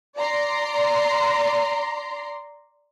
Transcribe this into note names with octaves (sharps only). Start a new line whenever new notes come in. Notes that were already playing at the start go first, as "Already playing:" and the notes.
D5 A#5 C6